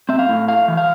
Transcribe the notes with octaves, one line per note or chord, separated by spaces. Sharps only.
C4 E5
F5
A2
A3 F5
E3
F5